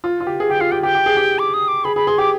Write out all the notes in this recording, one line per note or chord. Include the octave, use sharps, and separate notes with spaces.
F4
F4
G4
G#4
G4 G5
F4 F5
G4 G5
G4 G5
G4
G#4
G4
D6
D#6
D6
G#4 B5
G#4 B5
G#4 C6
G4 D6